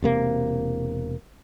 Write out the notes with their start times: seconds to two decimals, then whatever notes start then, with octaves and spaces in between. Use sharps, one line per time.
0.03 E1 C3 A#3